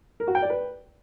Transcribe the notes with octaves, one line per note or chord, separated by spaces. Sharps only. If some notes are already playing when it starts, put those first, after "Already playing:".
A#4
F#4
G5
D5
B4